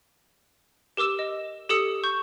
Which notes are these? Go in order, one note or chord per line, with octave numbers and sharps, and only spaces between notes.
G4 A#4 D6 E6 E7
D#5
G4 A4 D#6 E6 C#7
C#6 G6